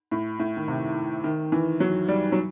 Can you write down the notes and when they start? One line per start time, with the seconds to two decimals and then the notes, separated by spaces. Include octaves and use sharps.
0.11 A2
0.39 A2
0.57 D#3
0.68 C3
1.24 D#3
1.52 E3
1.80 F#3
2.08 G3
2.32 F#3